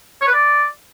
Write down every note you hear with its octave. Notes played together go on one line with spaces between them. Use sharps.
C#5
B4
D5